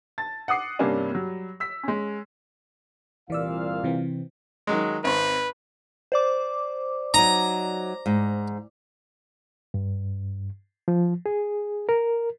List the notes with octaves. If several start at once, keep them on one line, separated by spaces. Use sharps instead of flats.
A5 A6
F#5 D6 D#6 C7
G2 C3 G3 A#3 C#4 D4
F#3 G3
E6 B6
G#3 C#4
C2 A#2 E3 D5 F5 E6
C3 E3 C4
D#3 F#3 G#3
G#1 C4 B4 C6
C5 D5 D6
F#3 D#4 A#5
G#2
G2
F3
G#4
A#4